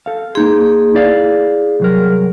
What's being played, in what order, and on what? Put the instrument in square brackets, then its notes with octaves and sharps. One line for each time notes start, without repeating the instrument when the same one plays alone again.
[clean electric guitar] A4 F5
[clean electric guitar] A#3 D#4 C6 [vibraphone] G#4
[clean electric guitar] E4 D5 F5
C2 F#3 A#4